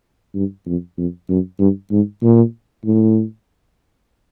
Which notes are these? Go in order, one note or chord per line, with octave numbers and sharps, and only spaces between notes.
G2
F2
F2
F#2
G2
G#2
A#2
A2